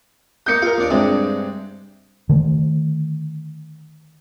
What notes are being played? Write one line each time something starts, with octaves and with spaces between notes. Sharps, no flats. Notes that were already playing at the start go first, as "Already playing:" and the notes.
A#3 D#4 D#6 G6 C#7
F4 A#4 F5
D#2 D4 D6
G2 C3 G#3 D4
D3 D#3 A3